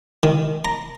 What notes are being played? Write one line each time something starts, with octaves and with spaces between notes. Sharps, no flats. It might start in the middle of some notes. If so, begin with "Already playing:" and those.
D#3
A#5